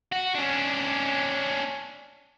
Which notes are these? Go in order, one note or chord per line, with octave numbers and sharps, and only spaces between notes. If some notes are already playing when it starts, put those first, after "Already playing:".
F#4
C#4 D4